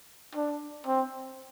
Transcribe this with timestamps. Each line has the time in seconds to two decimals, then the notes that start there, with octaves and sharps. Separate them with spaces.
0.35 D4
0.87 C4